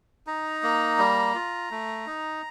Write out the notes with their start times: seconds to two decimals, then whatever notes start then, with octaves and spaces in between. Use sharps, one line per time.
0.27 D#4 A#5
0.63 A#3
0.98 G3
1.35 F4
1.71 A3
2.07 D#4